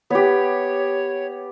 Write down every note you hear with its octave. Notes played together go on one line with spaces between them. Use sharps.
B3 G4 C#5